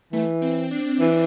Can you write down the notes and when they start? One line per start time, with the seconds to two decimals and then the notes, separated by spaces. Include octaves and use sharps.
0.12 E3 A3
0.42 C4
0.71 D4
1.00 E3